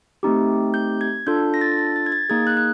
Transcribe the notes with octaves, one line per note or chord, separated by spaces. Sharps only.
A3 C4 D#4 G4
G6
G#6
D4 F4 A4 G6
A#6
A6
A6
A6
G#6
A6
A#3 D#4 G#4 G#6
F#6
F#6